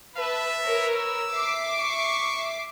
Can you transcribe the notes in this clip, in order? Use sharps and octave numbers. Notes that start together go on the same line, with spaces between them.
B4 E5 A5
A#4 B4 C#5
E6
E5 D6 C7
C#6